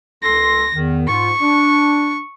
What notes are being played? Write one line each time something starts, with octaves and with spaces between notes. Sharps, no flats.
C#2 A4 C6 A#6
E2 D#3
G#2 F4 C#6
D4